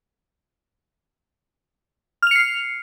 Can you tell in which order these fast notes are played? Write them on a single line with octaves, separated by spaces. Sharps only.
F6 F7 C#7 C7